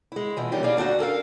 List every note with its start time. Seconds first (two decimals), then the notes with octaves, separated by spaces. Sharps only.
0.12 G#3 E4
0.36 B2 E3 F3
0.52 A#2 D#3 E3 G3 C#4 G4
0.64 A#3 C#4 G4 G#4 D5 F5
0.77 D2 D4 D#4 F#4
0.99 C#4 A4 A#4 F5